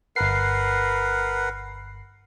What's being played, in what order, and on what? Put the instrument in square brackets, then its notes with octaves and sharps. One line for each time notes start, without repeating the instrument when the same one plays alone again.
[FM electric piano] G1 C7 [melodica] A#4 B4 F#5